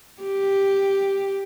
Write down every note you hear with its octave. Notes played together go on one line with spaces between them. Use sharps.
G4